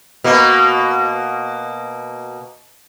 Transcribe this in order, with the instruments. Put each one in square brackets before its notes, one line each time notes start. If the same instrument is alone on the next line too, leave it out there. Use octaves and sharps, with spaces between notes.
[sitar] B2 A#3